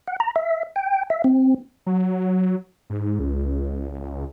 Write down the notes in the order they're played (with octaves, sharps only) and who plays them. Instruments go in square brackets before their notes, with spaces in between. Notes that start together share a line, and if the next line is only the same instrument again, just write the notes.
[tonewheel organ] F#5
A#5
E5
G5
E5
C4
[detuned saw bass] F#3
G#2
C#2